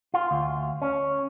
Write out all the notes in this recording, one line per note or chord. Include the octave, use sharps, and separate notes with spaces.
F4
D2
C#4